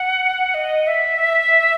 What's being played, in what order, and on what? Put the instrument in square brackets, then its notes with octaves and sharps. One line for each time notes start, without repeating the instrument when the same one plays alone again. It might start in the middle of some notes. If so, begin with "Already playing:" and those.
Already playing: [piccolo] F#5
D#5
E5